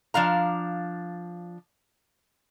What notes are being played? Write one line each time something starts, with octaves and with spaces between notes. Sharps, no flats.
F3 D4 F5 A#5